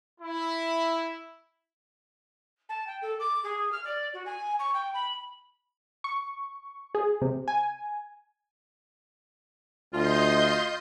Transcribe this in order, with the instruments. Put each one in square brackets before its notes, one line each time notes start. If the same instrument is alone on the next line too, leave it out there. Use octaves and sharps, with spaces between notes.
[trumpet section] E4
[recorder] A5
G5
A4
D6
G#4
F6
D5
F#4
G#5
C#6
G5
B5
[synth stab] C#6
G#4
C3
G#5
[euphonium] D2 [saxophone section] F4 [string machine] D#5 C6 G6